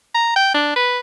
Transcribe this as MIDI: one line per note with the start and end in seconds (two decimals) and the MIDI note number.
0.15 0.31 82
0.36 0.52 79
0.54 0.71 62
0.76 0.99 71